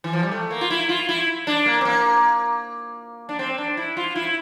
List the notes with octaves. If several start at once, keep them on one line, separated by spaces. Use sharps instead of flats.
E3
F3
G3
A3
A#3
F4
E4
F4
E4
D4
A#3
C4
A#3
D4
C4
D4
E4
F4
E4